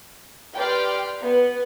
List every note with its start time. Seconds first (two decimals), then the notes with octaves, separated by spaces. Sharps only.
0.56 G4 B4 D5 G5 C6 F6
1.24 B3